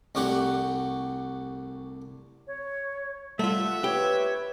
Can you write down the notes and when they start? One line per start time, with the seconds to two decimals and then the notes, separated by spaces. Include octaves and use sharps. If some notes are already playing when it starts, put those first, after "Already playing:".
0.15 C2 A3 D4 F#4 G4 F#5
2.47 C#5
3.39 G3 A3 F4 E5 F#5
3.84 G4 B4 C#5